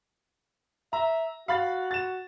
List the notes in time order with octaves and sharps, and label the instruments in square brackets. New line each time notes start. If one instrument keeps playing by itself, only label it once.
[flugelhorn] E5 [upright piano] A#5
[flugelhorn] F#4 [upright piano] F5 B5 A6
[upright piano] A6 E7